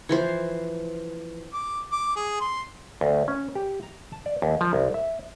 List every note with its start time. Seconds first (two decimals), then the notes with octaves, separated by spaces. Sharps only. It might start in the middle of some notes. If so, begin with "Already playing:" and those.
0.09 E3 F3 C5
1.53 D6
1.92 D6
2.16 G#4
2.40 C6
3.01 D2
3.28 C#4
3.55 G4
3.83 A#5
4.12 A5
4.26 D5
4.42 D#2
4.61 F3
4.73 C2
4.94 E5